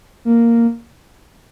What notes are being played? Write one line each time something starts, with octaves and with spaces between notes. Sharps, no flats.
A#3